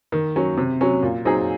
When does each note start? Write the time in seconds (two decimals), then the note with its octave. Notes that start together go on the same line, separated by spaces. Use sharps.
0.12 D#3
0.36 F#3 C#4
0.58 C3
0.81 F#3 C#4
1.03 A#2
1.25 F#3 C4 D#4 G#4